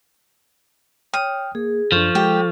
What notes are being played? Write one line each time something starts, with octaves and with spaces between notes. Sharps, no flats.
C#5 G5 D#6 F6
A#3 G#4
F#2 F3 D4 A4 C#6
G#3 G4